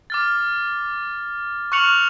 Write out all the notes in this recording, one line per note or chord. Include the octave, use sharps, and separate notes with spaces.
D6 F6 A6
C#6 F6 F#6 C#7 F7 F#7